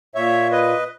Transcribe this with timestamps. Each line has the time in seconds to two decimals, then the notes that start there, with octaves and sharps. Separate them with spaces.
0.15 A#2 A#3 C#5 E5
0.51 B4 D#5